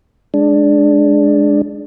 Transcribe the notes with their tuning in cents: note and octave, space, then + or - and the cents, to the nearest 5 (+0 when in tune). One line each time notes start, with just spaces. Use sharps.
G#3 +5 D4 +0